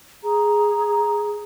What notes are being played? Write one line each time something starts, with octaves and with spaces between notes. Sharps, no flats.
G#4 A#5